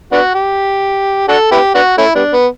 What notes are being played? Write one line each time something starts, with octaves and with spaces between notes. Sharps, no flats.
B3 D4 F#4
G4
D4 F#4 A4
B3 E4 G4
B3 D4 F#4
A3 C#4 E4
G3 B3 D4
B3